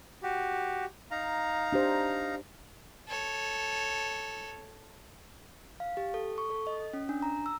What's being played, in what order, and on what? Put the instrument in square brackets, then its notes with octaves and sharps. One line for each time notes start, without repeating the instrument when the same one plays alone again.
[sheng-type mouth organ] F#4 G4
D#4 F5 A#5
[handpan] D4 G4 C5
[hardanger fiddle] A4 C#5
[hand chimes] F5
G4
A4
C#6
A4
D#5
C#4
D4
A#5
E6